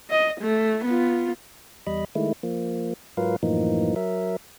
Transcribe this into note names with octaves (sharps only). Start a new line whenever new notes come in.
D#5
A3
B3 F4
E2 G3 D#5 B5
D#3 G#3 A3 E4
F3 A#3
G#2 F#3 F4 A#4 B4 F5
F#2 A2 E3 F3 A#3 D#4
F#3 A#4 E5